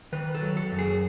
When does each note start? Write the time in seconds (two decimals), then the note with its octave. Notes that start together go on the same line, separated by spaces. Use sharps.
0.12 D#3 B4
0.35 A4
0.42 F#3
0.57 A4
0.72 F#2
0.79 G#4